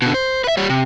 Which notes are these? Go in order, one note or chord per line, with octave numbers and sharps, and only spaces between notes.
B2 D3
C5
B4 E5
G3 C#5
C3